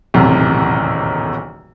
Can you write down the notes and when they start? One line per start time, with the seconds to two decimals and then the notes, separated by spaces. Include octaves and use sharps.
0.14 D#1 B1 E2 A2 C3